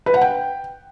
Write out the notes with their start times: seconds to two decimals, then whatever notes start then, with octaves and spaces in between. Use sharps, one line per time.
0.06 B4
0.14 F#5
0.21 G5